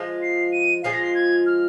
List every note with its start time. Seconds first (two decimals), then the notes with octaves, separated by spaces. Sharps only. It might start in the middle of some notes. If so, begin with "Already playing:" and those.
Already playing: F3 G#3 F4
0.22 C7
0.52 D#7
0.84 F3 G#3 F4 C7
0.93 A#6
1.02 C7
1.15 G#6
1.46 F6